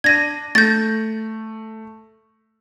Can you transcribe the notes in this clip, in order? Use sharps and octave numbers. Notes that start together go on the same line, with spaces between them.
D4 G#6 A#6 D#7
A3 G6 A6 A#6